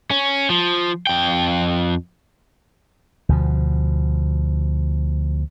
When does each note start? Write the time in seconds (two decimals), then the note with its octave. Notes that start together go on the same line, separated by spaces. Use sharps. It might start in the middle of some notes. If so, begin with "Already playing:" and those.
0.11 C#4
0.50 F3
1.07 F2 G5
3.29 D2 B2 F3